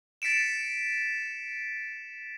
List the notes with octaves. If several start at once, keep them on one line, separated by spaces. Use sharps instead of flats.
A6 B6 C#7 D7 E7